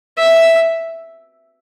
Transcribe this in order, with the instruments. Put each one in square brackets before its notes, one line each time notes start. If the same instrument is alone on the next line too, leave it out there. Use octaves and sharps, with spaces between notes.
[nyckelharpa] E5